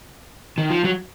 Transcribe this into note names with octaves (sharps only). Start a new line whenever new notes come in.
D#3
F3
F#3